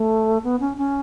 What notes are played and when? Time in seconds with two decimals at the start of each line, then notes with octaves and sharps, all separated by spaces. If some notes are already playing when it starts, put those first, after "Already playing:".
Already playing: A3
0.44 B3
0.60 C#4
0.77 C#4